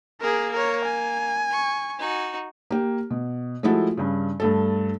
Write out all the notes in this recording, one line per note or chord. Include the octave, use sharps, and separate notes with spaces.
A#3 G#4 A#4
A#4 C#5
G#5
C#6
D#4 F#4
A#3 G4
B2
F3 G#3 A3 E4 F#4 A4
G2 C#3
G2 A3 A4